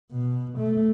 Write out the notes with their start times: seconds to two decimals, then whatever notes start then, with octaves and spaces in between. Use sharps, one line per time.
0.11 B2
0.58 A3